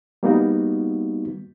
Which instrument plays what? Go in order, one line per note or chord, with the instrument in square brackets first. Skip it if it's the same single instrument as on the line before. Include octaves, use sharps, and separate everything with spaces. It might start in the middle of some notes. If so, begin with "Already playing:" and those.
[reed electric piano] G3 A#3 B3 D#4 F#4